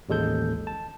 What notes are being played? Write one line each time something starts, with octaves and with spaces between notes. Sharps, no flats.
A1 D#2 G#3 A4 G6
A5